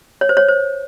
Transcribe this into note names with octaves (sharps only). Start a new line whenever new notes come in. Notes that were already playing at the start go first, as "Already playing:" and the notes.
C#5
C5
C#5
C5